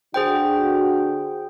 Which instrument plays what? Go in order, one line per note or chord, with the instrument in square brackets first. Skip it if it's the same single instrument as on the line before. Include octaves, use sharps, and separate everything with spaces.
[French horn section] D3 D4 F#4 [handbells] G#4 C5 G5